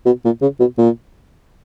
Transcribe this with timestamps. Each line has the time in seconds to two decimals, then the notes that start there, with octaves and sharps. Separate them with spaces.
0.06 B2
0.25 A#2
0.42 C#3
0.60 B2
0.78 A#2